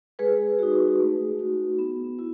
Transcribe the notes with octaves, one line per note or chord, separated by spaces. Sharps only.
G#3 G#4 B4
D#4 F#4
A3
D#4 F#4
B3
E4